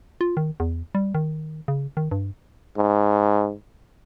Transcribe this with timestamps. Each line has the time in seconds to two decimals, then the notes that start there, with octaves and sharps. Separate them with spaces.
0.21 F4
0.37 D#3
0.60 E2
0.95 G3
1.15 D#3
1.68 C#3
1.97 D#3
2.11 G2
2.77 G#2